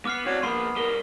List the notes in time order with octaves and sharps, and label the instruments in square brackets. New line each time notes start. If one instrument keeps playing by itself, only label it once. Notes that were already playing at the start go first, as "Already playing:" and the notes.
[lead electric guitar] B3 [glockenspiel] D6 F6 C7
[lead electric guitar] C4 D5 [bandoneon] F#4 C#5
[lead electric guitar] F3 A#3 [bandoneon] B3 [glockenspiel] C6 C#6 C7
[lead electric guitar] G3 A#4 [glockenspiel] G7